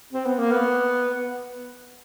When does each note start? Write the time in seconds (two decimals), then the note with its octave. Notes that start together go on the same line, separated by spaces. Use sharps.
0.13 C4
0.26 B3
0.39 A#3
0.52 B3